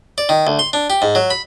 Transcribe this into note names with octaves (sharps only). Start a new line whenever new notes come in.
D5
D#3
D2
C6
D4
G4
G#2
F#3
B5